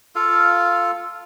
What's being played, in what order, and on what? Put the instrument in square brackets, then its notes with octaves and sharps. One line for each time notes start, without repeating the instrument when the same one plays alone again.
[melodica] F4 A4 F5